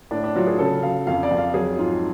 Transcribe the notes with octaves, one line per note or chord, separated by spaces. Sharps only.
A2 D4
D4
F#3 F4
G#4
C#3 A4
F#3 F5
F2 F5
D5
F2
F5
F#3 G#4
G#2 F4